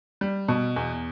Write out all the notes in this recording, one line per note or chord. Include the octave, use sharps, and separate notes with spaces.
G3
B2
E2